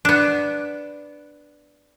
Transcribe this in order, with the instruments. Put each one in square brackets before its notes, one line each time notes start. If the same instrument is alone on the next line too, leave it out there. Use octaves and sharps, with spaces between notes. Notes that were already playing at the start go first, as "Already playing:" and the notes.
[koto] B3 D4